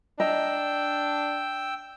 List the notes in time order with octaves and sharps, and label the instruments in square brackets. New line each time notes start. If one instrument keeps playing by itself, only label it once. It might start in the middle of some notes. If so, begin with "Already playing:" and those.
[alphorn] D4 [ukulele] D#5 A#5 [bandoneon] G5 E6